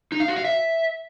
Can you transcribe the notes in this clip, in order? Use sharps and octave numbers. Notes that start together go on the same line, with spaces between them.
D#4
F5
F#4
F5
E5